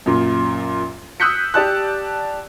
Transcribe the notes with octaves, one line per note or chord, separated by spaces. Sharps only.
F#2 A#2
D#6 E6 F#6 G6 B6 C#7
G4 D5 A5 F#6